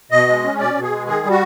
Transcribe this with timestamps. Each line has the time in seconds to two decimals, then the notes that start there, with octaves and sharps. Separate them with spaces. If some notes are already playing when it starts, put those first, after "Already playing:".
0.11 B2 D#5
0.27 G#3
0.43 C#4
0.59 B2 D5
0.75 B2
0.83 G#4
0.90 G#3
1.06 D#3 G#4
1.23 G3
1.30 F#4